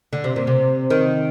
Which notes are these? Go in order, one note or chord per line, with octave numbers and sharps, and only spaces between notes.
D3
C3
A#2
C3
D#3